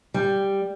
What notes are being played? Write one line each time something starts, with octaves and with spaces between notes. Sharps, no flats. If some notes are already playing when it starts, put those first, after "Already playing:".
G3